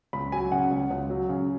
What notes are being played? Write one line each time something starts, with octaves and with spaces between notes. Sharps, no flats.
C#2 B5
F#3 G#5
C#3 F#5
C#2
C#2
F#3
C#3